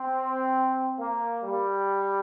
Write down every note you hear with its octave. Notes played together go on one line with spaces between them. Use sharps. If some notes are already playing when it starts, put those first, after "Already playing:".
Already playing: C4
A#3
G3